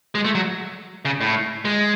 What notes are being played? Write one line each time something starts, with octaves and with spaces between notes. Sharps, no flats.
G#3
A3
F#3
C#3
A2
G#3